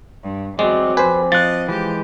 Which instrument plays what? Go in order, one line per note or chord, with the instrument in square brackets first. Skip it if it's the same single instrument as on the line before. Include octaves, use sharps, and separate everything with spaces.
[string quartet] G2
[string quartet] E2 F#3 [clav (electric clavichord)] G#3 [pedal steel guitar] C4 D5
[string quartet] F2 [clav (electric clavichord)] B4 [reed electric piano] C5 G#5
[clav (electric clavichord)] F3 [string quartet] D#5 [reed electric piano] F#6 A6
[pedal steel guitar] E3 G#3 [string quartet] G4